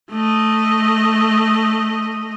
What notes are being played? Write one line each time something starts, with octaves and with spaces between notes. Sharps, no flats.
A3 D#5